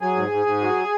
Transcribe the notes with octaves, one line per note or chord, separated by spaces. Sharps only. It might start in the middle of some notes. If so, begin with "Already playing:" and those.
F#3 G#4 G#5
G#2
G#2
G#2
F#3